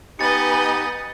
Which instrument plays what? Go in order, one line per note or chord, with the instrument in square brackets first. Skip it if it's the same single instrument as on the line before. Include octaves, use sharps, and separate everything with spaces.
[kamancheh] B3 G#5 [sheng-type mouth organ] D#4 G4 [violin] B4 D#5 [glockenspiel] A6 C#7